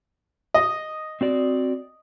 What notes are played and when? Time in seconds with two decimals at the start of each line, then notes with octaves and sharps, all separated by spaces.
0.54 D#5
1.21 C4 F#4 D5